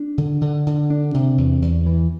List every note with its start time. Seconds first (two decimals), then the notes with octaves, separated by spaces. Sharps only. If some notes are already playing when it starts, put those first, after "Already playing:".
Already playing: D4
0.18 D3
0.41 D3
0.67 D3
0.90 D4
1.14 C3
1.38 E2
1.62 E2
1.86 E3